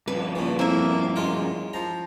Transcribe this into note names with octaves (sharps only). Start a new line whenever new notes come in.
G2 F3 B4
A#2 C#3 E3
F2 A#3 E4 E5
F#2 G#3 F4 A#4
F3 A#5